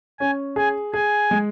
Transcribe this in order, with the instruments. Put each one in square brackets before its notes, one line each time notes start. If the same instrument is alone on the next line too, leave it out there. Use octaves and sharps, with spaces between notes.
[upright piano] C#4 [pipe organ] G#5
[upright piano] G#4 [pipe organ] G#5
[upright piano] G#4 [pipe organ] G#5
[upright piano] G#3